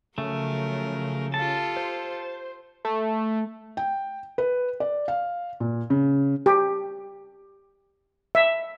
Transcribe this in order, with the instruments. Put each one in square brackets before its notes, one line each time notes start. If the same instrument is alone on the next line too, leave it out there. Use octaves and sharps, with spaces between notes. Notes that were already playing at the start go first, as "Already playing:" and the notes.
[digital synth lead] C#3 [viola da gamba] F3 F#3 A#4 [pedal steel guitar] A3
[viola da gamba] F4 G4 A4 [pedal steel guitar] A5
[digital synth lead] C5
[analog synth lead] A3
[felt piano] G5
B4
D5
F5
A#2
C#3
[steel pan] G4
E5